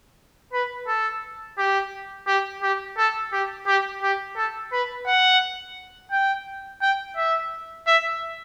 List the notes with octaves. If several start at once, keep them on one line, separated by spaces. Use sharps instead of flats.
B4
A4
G4
G4
G4
A4
G4
G4
G4
A4
B4
F#5
G5
G5
E5
E5